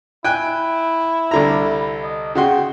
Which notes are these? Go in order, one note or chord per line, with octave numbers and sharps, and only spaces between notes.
E4 G5 G#5 F#6
C2 D3 A#5
D#5
C#3 F#4 G5 C6